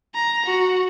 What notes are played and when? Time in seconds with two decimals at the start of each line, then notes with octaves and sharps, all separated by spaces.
0.15 A#5
0.46 F#4